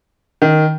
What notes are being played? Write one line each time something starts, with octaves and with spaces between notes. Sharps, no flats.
D#3